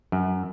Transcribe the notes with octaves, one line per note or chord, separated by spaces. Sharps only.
F#2